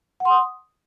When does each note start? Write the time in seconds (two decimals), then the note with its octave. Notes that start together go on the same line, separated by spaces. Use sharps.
0.20 F#5
0.25 C6
0.30 D#6